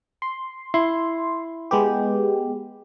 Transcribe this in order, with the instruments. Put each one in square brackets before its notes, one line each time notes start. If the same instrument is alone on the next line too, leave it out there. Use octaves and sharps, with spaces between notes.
[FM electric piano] C6
[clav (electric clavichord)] E4 [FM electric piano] C6
[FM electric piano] G#3 B3 G4